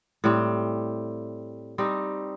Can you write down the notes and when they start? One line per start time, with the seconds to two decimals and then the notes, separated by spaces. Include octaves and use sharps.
0.24 A2 G3 C4
1.78 G3 C4 D#4